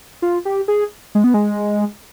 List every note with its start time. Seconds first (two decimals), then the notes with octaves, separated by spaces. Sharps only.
0.22 F4
0.45 G4
0.68 G#4
1.15 G#3
1.24 B3
1.34 G#3